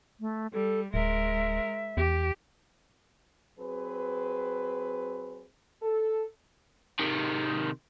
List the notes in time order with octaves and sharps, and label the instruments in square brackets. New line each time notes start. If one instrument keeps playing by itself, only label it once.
[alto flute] A3
[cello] G3 [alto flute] A4
[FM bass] D1 [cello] G#3 A#4 [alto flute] E5
[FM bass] E2 [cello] G4
[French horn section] F#3 C4 G#4 B4
A4
[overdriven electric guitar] C3 D#3